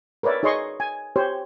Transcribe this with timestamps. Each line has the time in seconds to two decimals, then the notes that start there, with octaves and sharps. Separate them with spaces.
0.23 A#4 B4 C#5 D5 E5
0.43 D#4 G#4 C#5 D#5 C6 C#6
0.80 G#5
1.16 G4 C5 C#5